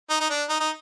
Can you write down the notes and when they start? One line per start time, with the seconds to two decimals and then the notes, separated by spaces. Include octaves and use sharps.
0.10 D#4
0.21 D#4
0.30 D4
0.49 D#4
0.60 D#4